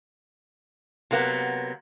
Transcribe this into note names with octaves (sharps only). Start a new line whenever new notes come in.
C3 F#3 A#3 B3